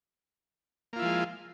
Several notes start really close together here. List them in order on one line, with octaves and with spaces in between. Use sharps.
A#3 F4 E4 F3 G#3